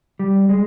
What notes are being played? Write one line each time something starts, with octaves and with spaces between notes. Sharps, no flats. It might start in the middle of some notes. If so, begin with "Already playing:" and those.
G3
G#3